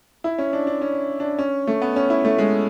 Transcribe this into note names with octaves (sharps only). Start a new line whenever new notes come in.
E4
C#4
D4
D4
C#4
D4
C#4
A3
B3
C#4
E4
A3
G#3